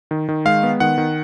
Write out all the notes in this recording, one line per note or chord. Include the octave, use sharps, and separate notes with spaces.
D#3
D#3
G#3 F5
B3
D#3 F#5
D#3